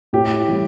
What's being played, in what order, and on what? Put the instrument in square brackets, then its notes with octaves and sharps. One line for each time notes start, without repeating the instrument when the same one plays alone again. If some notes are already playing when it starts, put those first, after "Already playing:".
[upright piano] A2 [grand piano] G4
[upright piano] E3 G3